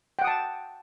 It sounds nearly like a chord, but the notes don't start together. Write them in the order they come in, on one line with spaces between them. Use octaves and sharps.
G5 F#5 D#6 A5